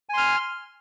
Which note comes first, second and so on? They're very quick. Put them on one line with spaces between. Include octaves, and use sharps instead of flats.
G#5 C6 F6